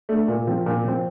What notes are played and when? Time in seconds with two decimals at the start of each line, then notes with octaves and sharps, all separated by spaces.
0.09 A3 D4
0.28 A#2
0.47 F3 C4
0.66 A#2
0.84 F3 C4